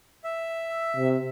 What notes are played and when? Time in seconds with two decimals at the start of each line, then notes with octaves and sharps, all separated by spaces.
0.24 E5
0.97 C3